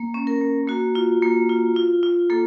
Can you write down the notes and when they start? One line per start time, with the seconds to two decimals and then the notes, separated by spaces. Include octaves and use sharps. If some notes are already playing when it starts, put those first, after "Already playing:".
Already playing: A#3
0.14 C#4
0.27 A#4
0.41 A#3
0.68 A#3 F#4
0.95 F4
1.22 A#3
1.49 F4
1.76 F4
2.03 F4
2.30 A#3 A4